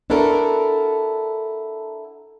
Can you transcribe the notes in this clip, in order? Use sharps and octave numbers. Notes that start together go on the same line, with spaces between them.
D4 E4 F#4 A4 A#4